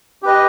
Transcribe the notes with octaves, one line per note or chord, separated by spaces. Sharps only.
G4 B4 D#5